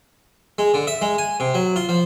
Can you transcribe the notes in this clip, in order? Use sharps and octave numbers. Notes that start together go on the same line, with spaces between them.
G#3
D3
E5
G#3
G#5
C3
F#3
F4
F3